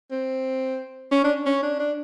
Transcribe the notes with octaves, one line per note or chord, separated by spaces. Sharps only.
C4
C#4
D4
C#4
D4
D4